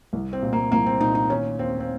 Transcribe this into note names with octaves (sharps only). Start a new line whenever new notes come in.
C2
C4
A#2
A#3
C2 A#3
C4
A#2 D#4
D#4
D#3 C#4
D#2 C4
C4